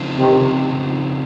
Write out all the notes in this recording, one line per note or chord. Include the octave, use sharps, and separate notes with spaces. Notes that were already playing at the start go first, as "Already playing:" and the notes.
Already playing: C#3 F3 C4 D#4
C3 D#3